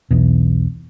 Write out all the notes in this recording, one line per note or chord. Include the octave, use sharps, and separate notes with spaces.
B1 E2 B2